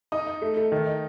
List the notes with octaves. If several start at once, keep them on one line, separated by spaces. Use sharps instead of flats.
D#4 D#6
D#4
A3
A3
D#3
D#4